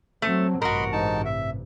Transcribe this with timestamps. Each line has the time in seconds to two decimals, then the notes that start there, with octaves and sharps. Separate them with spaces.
0.22 F#3 A3 C4
0.62 A1 G2 C3 F#4 A#4 D#5 B5 C6
0.93 G#2 D#4 A5
1.25 E5